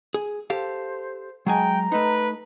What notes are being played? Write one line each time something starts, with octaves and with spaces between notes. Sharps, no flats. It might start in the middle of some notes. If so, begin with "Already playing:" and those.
G#4
G4 A4 C5 F5
F#3 G#3 G5 G#5 A#5
A3 D#4 B4